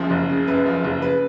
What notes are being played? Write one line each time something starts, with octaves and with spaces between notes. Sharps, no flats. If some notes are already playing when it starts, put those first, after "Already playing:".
Already playing: F#1 F#2 C#3 F3
F#1
C#3
F#2 B4
F3
F#1
C#3 B4